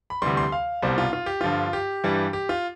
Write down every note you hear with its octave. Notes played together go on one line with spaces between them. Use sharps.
B5
D2 C3 E3 G3 C6
C6
F5
C2 B2 G3 C5
F4
F4
G4
G2 D3 F3 F4
G4
G2 E3 G3
G4
F4